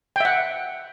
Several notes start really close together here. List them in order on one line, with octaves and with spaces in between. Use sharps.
G5 E5 F#5